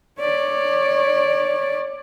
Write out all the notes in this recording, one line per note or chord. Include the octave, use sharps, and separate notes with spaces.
C#5 D5